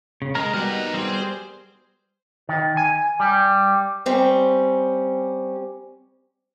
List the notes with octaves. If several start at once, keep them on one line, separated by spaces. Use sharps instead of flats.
C#3
G#3 A#4 A#5
G3 B3 F#4 A#4 D#5 F#5
D#4
G3 C4 G#4
C5
D#3
G#5
G3
G3 C4 C#4